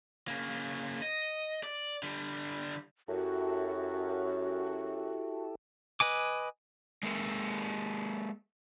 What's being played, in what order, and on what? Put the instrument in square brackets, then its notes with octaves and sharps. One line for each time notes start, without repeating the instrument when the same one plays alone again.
[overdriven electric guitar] C#3 A#3
D#5
D5
D3 G3
[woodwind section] F#2 [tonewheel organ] E4 G4 A4 [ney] F#4
[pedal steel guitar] B4 D#5 G#5 D6
[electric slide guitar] G#3 A#3 G#4 A#4